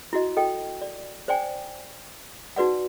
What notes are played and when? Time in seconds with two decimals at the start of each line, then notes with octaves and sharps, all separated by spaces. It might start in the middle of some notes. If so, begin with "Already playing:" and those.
0.13 E4 F#4 D#5
0.37 A4 D#5 G5
0.81 D5
1.28 C5 D5 G5 G#5
2.56 D#4 F#4 B4 D5 F#5